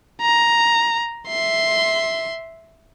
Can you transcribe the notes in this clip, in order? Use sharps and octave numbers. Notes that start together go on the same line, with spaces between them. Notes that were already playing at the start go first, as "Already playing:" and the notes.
A#5
E5 C6